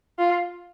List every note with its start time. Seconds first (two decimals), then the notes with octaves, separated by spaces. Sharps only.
0.19 F4